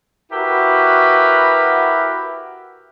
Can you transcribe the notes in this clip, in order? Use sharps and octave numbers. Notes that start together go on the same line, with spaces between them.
E4 F#4 G4 A#4 B4